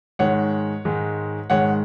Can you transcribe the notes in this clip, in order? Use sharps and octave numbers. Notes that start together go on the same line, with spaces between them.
G#2 D#3 G#3 C#5 F#5
G#2 D#3 G#3
G#2 D#3 G#3 C#5 F#5